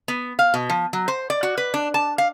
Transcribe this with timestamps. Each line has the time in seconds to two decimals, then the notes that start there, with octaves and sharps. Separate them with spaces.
0.08 B3
0.39 F5
0.54 B2
0.70 F3
0.93 F#3
1.08 C5
1.30 D5
1.43 F#4
1.58 B4
1.74 D4
1.94 A5
2.18 F5